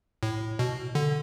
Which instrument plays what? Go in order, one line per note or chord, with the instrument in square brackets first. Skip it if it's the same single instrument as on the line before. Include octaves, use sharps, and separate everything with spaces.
[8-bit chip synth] A2
B2
D3